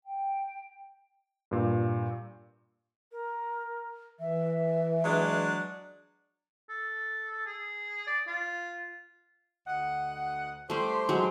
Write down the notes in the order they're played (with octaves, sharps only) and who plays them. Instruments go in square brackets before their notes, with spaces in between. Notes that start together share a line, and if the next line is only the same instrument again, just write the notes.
[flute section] G5
[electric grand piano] G2 A#2
[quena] A#4
[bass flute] E3 [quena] E5
[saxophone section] F#3 G#3 D4
[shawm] A4
G#4
D5
F4
[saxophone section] D2 D#5 F#5
[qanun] G3 A3 [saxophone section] G4 C5
[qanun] F#3 G#3